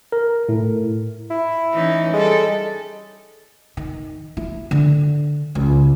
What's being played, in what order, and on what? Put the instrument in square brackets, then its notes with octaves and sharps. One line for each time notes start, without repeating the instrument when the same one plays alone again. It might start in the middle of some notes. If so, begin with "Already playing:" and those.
[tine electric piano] A#4
A2
[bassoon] E4
[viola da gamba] E3 C#4 D#4
[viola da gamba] G3 A4 [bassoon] G#3
[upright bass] D#3
E4
D3
C#2